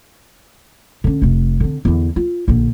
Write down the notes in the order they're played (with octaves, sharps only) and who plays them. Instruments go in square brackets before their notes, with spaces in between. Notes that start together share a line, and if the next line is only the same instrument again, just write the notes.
[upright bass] D3 C#4
F1 C3
D3 C4
E2 D3
F4
A#1 D3